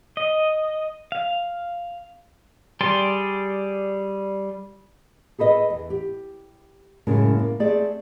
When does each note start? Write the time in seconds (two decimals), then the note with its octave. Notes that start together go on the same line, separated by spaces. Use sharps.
0.17 D#5
1.12 F5
2.81 G3 G#4 D5 G5 C6
5.38 G#4 A4 B4 D#5
5.70 E2
5.90 G4
7.07 F#2 A2 C#3 G#3 A#3 C#4
7.39 A#3
7.60 A3 C4 G#4 D5